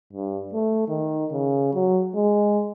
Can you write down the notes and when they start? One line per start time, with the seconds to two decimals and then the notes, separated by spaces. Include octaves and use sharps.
0.13 G2
0.54 A3
0.88 D#3
1.32 C#3
1.74 F#3
2.15 G#3